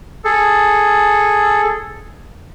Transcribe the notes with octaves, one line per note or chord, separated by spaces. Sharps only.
G#4 A4